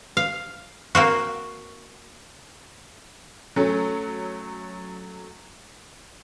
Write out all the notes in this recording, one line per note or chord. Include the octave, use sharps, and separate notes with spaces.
F5
A#3 C4 F#4
F#3 A3 C#4